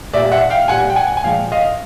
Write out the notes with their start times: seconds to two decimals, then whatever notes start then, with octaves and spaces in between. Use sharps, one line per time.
0.13 A#2 G3 D5 E5
0.31 E5 F#5
0.50 F5 G5
0.68 A#2 G3 F#5 G#5
0.90 G5
0.96 F#5 G#5
1.17 G#5
1.24 A#2 F3 G#3 F5 G5
1.52 D#5 F5